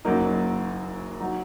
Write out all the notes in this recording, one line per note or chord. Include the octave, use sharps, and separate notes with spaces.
F#1 F#2 F#3 A#3 D#4
F#3 D#4